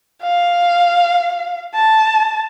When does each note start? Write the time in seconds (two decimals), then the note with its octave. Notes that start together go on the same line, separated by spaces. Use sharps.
0.23 F5
1.74 A5